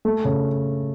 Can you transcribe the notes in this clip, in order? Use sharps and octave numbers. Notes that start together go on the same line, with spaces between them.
A3
C#3